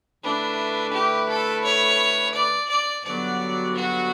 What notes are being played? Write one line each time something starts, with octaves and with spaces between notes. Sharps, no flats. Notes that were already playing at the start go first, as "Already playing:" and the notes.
D3 A3 D4 E4 B4
G4
A4
C#5
D5
D5
G2 D3 F#3 B3 D5
F#4